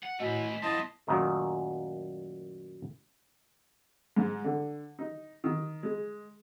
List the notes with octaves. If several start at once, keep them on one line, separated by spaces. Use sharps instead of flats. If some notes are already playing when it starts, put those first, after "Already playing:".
F#5
A2 A3 F#4 B4 D#5 G#5
F3 B3 E4 D#5 A5 C6 A6 A#6
F#2 A#2 D#3 A3
G#2
D3
D#4
D#3
G#3